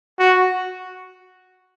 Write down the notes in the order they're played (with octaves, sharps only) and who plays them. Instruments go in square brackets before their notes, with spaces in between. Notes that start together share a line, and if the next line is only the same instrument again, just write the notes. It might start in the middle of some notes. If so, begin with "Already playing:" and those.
[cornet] F#4